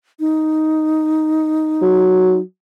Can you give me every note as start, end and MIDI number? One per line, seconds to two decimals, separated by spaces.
0.20 2.40 63
1.82 2.39 54